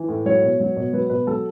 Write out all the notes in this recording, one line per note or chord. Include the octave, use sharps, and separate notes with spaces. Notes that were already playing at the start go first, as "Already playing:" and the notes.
Already playing: E3
A2
F#3 C#5
B2
F#3
B2
F#3 B4
B2 B4
F#3 A4